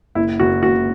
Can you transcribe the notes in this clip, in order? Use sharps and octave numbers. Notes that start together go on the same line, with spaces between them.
F#1 E4
F#1 F#4
F#1 F#4